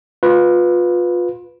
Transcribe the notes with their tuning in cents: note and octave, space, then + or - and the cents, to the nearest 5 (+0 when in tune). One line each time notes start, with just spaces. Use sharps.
F4 +25 B4 +0